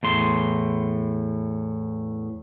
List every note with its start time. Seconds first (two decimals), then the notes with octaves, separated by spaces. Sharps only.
0.03 E2 A2 C6